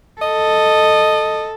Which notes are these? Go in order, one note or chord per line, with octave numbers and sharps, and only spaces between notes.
A4 D#5